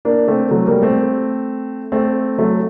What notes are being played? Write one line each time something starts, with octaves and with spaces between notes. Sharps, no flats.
A#3 D4
A3 C4
F#3 A3
G3 A#3
A3 C4
A3 C4
F#3 A3